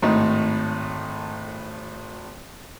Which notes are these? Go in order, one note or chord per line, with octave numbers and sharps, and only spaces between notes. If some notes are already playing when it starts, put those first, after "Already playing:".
G#1 A2 D#4